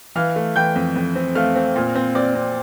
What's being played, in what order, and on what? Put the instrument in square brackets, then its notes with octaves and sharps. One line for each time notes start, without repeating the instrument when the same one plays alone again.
[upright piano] E3 F5 F6
A3
E3 G5 G6
F2
F2
C4
A3 F5 F6
C4
A#2
C4
C4 D5 D6
C4